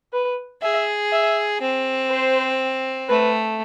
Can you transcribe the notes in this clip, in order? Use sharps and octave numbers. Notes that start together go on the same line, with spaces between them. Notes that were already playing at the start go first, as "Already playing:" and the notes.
B4
G#4 E5
E5
C4
C5
A3 B4